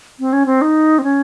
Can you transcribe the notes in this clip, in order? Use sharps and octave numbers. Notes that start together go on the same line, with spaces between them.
C4
C#4
C4
D#4
C4
C#4